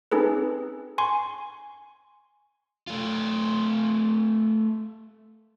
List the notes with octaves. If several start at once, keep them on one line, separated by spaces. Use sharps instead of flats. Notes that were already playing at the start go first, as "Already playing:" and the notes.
C4 C#4 D#4 G#4 A4 B4
G#5 C6 C#6
A3 F4